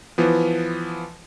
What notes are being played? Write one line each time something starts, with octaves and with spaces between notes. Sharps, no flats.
E3 F3 B3